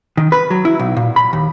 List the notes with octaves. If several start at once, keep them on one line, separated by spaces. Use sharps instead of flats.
D#3
B4
F#3
E4
B1
A#2
B5
D#2